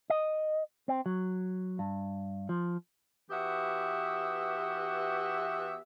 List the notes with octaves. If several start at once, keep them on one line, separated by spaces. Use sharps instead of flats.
D#5
C4
F#3
G2
F3
E3 B3 F#4 G4 E5